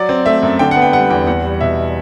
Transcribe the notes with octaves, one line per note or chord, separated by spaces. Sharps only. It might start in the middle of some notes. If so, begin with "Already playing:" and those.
Already playing: F#3 D5
C4
A3 E5
F#2
D3 G5
F#5
B3
G5
G3 F#5
E2 G5
E2 F#5
G3
B2 E5